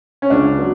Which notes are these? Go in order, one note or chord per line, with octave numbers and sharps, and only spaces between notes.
C#4
C#2 D4
F#3 B3